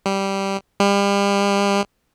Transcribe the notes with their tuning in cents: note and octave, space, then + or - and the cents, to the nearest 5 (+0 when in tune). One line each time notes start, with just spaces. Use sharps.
G3 -5
G3 +35